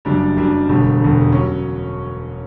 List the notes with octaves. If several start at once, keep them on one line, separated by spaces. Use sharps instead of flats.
F#1 F#2 C#3 G3 D4
F#1 F#2 C#3 G3 D4
E1 E2 D3 G3
E1 E2 D3 G3
F#3 C#4